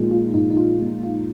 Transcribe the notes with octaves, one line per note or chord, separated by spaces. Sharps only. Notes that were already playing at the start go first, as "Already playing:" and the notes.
Already playing: A#1 A#2 G#3 D#4 F4
F4
A#1 D#4
D#4
F4
A#2 G#3
F4